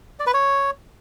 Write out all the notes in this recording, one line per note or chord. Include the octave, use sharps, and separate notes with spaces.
D5
B4
C#5